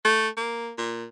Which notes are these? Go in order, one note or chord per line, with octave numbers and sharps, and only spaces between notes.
A3
A#3
A#2